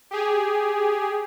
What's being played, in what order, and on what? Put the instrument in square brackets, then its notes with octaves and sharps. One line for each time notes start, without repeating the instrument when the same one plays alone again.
[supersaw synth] G4 G#4